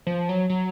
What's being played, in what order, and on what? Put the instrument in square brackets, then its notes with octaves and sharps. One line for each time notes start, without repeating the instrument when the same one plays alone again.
[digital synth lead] F3
F#3
F#3